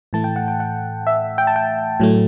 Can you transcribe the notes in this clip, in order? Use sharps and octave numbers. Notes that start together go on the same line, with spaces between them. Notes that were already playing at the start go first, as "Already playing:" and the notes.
A2 E3 A3 A5
G5
F#5
G5
F#5
E5
G5
A5
G5
A2 F#3 A3